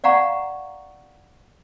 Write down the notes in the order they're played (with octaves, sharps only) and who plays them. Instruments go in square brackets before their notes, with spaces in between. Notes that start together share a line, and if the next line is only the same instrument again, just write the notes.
[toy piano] D5 F5 F#5 A#5 C#6